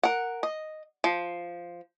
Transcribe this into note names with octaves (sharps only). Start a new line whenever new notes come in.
A#4 F#5
D#5
F3